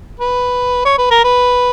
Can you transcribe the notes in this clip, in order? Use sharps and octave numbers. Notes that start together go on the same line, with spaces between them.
B4
C#5
B4
A#4
B4